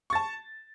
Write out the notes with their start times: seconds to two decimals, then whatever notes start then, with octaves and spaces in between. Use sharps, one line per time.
0.10 C#6
0.13 A6
0.15 A5